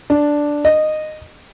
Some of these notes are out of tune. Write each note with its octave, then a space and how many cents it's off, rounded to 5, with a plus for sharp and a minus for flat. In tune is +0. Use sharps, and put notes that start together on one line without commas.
D4 +0
D#5 -15